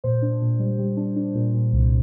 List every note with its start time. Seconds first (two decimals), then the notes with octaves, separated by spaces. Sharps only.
0.04 A#2 C5
0.22 D4
0.42 A#2
0.59 G3
0.79 G3
0.97 D4
1.16 D4
1.35 A#2
1.54 A#2
1.73 C2